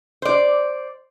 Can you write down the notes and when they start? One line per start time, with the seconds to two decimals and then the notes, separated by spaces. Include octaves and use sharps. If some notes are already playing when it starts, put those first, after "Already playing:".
0.22 C5 D5